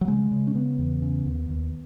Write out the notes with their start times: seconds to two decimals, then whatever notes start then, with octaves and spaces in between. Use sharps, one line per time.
0.01 F#3
0.07 C#3 G#3
0.31 C#3
0.47 C#4
0.55 C#3 B3
0.79 E2
1.02 C#3
1.25 D#2
1.50 D#2